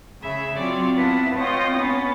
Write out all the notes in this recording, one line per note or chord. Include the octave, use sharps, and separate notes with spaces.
C#3 G#4 E5 B5
F#3 C4 F4 C#5 D5
B3 E4 B4 F5 F#5 A5
C4 F4 C#5 D#5 G5
B3 C#4 B5 A6